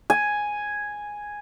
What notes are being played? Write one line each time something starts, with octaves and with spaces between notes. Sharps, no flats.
G#5